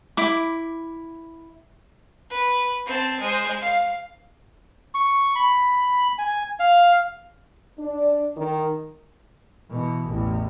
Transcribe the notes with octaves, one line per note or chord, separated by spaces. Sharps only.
E4 D6
B4
C4 A5
G#3 C5
F5
C#6
B5
G#5
F5
D4
D#3
B2 E3
A1 E2